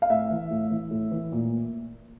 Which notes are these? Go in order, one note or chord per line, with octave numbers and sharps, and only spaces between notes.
F5
A2 E5
E3
A2
E3
A2
E3
A#2